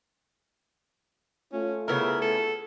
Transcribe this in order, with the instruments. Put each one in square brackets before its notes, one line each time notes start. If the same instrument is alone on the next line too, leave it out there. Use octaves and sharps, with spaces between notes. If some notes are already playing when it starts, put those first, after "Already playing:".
[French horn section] A3 F4 [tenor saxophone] C#4
[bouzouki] C#3 B3 E4 [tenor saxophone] A#4
[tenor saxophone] A4